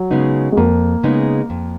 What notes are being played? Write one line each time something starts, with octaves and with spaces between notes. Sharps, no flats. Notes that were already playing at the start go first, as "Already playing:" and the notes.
Already playing: F#3
C#3 G#3 B3 D#4
G#3
F2 A#3
C#3 G#3 B3 D#4
F2